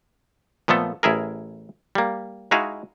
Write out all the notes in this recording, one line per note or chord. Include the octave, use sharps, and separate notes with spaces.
A#2 F3 A3 B3 A4
A1 E4 G#4 A#4
G3 A#3
G#3 D#4 E4 F#4 F5 G#5